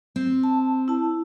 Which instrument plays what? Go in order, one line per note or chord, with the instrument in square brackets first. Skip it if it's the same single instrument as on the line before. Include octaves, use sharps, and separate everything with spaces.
[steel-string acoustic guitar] C4
[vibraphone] A5
E4 A5